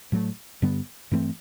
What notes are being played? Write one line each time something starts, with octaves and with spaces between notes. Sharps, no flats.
A2 F#3 A3
G2 D3 G3 B3
G2 E3 A3 C4